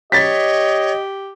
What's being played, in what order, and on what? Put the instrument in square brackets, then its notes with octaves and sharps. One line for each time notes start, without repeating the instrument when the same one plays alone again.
[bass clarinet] G4 [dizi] C#5 [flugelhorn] D#5 [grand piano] A6 B6